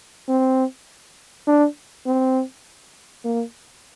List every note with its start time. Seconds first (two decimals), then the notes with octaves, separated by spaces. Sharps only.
0.29 C4
1.47 D4
2.07 C4
3.25 A#3